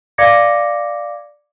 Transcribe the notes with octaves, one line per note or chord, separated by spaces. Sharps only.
D5 F5 D6 G#6 A#6 C#7